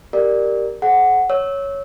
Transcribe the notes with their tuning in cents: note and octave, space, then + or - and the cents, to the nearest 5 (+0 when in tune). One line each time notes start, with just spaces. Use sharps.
G4 +0 A#4 +0 D5 +10
G#4 +40 C5 +15 F#5 +0
C#5 +0 E6 -20